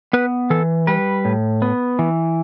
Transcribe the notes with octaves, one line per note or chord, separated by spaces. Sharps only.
B3 B4
E3 A4
G3 B4
A2
B3
E3